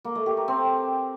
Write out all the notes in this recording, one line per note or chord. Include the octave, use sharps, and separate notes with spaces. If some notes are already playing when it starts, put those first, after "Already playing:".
A#3
A3
G4
A#4
C4